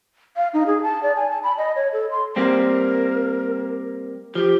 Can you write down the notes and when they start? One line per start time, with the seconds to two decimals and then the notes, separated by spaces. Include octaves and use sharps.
0.37 F5
0.54 D#4
0.67 G#4
0.83 A5
1.03 D5
1.16 G#5
1.30 A5
1.43 B5
1.58 D#5
1.76 C#5
1.93 A4
2.11 C6
2.36 G3 A#3 C4 A#4
4.35 F3 G4